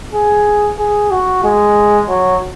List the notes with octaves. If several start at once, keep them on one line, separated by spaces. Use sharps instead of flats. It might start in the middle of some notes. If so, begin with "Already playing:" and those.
G#4
G#4
F#4
G#3
F#3